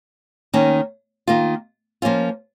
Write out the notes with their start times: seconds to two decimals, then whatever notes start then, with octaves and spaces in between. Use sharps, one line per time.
0.54 D#3 A#3 C#4
1.27 D#3 A#3 F4
2.02 F3 A#3 C#4 F4